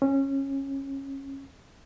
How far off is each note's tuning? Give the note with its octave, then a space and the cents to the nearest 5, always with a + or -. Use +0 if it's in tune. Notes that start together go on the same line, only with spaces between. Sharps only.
C#4 -20